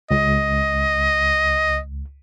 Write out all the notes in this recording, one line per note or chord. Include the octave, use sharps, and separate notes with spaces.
C#2 D#5